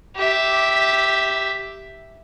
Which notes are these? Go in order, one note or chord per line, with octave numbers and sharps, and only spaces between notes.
G4 E5